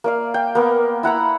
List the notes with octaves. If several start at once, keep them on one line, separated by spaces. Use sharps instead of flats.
A#3 D5 F5
G5
A#3 B3
E4 F#5 A#5 B5